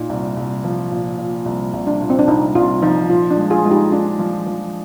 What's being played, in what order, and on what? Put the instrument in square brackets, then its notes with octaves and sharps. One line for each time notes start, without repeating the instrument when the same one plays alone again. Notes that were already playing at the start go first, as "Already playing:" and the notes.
Already playing: [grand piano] A#2 [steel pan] D#4
[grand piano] C2
C2
F3
A#2
A#2
C2
C2
[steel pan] D4
[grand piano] A#2
[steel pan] C4
D4
[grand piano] C2 [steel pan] D#4
[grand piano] C2 [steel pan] F4
[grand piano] F3 [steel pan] D#4
[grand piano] A#2 [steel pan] F4
[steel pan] D4
[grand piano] G#3
[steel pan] F4 G#4
[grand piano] G#3 [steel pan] F4
[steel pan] D#4 G4
[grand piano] D4 [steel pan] F4
[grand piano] F3
F3